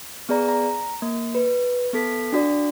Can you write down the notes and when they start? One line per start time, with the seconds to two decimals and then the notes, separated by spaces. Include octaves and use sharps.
0.29 B3 G#4 D5 A#5
0.49 A#5
1.02 A#3
1.35 B4
1.93 B3 A4 B6
2.32 D4 F#4 D5